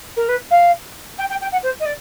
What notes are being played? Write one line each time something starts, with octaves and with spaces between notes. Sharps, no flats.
A#4
B4
F5
G5
G5
G5
F#5
C5
D#5
D5